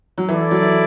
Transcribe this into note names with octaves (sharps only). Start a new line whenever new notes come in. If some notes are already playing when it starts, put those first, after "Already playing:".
F#3
E3 E4 A4 D5
F#3
E3